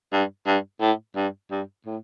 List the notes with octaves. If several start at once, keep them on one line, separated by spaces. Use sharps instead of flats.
G2
G2
A2
G2
G2
A2